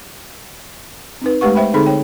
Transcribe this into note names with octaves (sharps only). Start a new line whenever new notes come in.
C4 D#4 B4
G#3 A3 G4 B4 F#5 C#6
C5 E5 G5 B5
D3 C4 D#4 G#4 A4 B5
C#5 G5